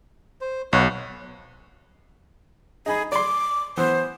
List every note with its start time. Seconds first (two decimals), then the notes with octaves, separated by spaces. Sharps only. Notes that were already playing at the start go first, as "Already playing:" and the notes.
0.41 C5
0.73 B1 F#4 B4 C#5
2.86 D#4 G#4 B5
3.12 D5 C6 D6
3.77 E3 B3 C5